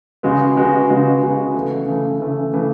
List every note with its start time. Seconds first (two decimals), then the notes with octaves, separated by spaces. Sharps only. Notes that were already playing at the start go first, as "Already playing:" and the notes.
0.23 C#3 G#3 B3 F#4
0.56 C#3 G#3 B3 F#4
0.89 C#3 G#3 B3 F#4
1.22 C#3 G#3 B3 F#4
1.55 C#3 E3 A3
1.87 C#3 E3 A3
2.20 C#3 E3 A3
2.53 C#3 E3 A3